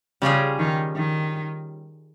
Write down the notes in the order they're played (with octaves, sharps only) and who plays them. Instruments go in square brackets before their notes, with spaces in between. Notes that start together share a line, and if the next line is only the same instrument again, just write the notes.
[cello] C#3 [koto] G3 C#4 F4 G#4
[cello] D#3
D#3